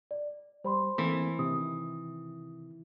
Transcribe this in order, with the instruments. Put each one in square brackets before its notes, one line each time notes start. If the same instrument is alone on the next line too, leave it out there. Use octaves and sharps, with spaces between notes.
[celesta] D5
[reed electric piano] G3 [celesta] C5 B5 C6
[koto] E3 [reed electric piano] A3 A#3 C4
[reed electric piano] C3 D#3 [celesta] D#6